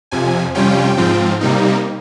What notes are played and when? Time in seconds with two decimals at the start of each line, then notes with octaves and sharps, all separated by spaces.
0.11 F2 C3 F3 G#5
0.55 F2 C3 G3 C#4 F4 G5
0.97 G#2 F3 C4 F4
1.41 C3 G3 A#3 D#4